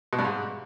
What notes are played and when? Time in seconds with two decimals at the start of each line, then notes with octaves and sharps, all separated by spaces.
0.13 B2
0.19 G2
0.25 G#2